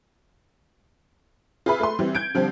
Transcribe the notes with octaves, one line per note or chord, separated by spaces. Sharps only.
F4 G#4 B4 E5 B5
A3 B4 C6
E3 G3 C4
G6 G#6 D7
D3 F3 G3 C4